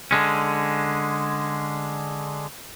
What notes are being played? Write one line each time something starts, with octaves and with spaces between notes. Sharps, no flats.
D3 G#3 C#4